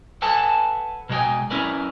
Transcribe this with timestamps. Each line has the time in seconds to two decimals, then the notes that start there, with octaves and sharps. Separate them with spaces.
0.22 A4 B4 F#5 G#5 A5
1.09 B2 G#3 F#4 C#5 G5 G#5
1.50 C#4 E4 A#4 B4 D5